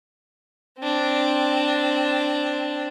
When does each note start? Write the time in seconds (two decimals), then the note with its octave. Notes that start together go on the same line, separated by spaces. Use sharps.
0.79 C4 D4